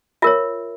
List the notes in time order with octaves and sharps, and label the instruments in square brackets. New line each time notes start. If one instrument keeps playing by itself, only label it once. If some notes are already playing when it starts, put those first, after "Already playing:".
[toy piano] F4 A#4 C#5 E5